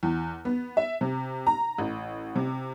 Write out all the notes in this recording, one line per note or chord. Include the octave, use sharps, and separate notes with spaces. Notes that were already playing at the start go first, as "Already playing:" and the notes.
E2
B3
E5
C3
A#5
A1
C3